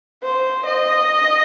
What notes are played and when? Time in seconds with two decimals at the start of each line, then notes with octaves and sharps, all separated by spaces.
0.23 C5
0.67 D#5